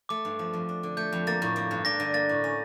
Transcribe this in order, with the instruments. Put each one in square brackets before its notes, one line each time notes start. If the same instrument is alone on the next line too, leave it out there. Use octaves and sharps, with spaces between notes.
[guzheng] A3 [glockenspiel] D6
[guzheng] G2
F3
F2
D4
D3
[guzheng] A3 [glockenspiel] G6
[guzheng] F2
[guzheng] A#3 [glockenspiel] A6
[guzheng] A2
A#3
G2
[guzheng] D4 [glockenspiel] A#6
[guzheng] D3
[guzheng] A#3 [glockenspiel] A6
[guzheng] A2
C#4